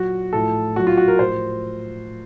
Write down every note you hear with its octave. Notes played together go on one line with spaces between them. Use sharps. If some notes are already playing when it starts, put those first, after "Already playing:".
Already playing: A#2 F#3 F#4
A2 F3 A4
A#2 F#3 F#4
F4
F#4
A#4
A2 F3 C5